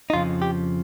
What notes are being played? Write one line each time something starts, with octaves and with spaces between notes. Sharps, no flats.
D#4
F2 C#3 F3 F4
G4